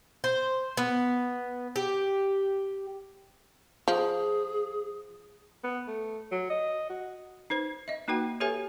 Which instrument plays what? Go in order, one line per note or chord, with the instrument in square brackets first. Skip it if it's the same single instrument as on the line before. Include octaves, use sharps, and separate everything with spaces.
[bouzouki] C5
B3
G4
[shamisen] F3 [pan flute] G#4
[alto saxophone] B3
A3
F#3
D#5
F#4
[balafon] D#4 B4 C5
D#5 E5
A#3 D#4 F#4 B4 G5
G4 A4 B4 C#5 E5 G#5